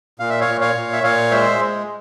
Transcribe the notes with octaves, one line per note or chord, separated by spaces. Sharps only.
A#2 F5
E5
C#5 F5
A#2
C#5 F5
A#2
E5
A#2 C#5 F5
G#3 C5 E5
G#3